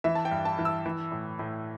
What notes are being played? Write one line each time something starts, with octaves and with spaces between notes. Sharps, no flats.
E3 E5
A5
G5
G2
A5
E3
E6
E3
A2
A2